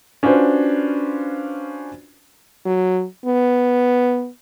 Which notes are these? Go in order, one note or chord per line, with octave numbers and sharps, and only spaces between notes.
C#4 D4 F4 F#4 B4 C5
F#3
B3